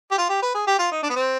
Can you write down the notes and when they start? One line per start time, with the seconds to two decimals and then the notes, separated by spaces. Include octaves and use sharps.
0.11 G4
0.18 F4
0.29 G4
0.42 B4
0.55 G#4
0.67 G4
0.79 F4
0.92 D#4
1.03 D4
1.10 B3
1.16 C4